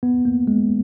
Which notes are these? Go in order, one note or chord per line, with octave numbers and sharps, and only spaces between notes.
B3
A#3
G#3